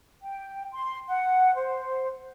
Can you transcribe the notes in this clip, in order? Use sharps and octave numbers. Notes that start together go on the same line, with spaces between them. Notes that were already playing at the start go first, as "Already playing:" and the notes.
G5
C6
F#5
C5